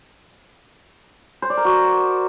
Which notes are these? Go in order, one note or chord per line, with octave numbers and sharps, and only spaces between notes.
C5
D5
A#4
F#4